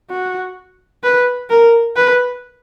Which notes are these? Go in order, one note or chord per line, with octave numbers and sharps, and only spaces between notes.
F#4
B4
A#4
B4